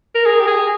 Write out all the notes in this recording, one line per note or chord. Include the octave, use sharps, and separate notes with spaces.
A#4
G#4
G4
G#4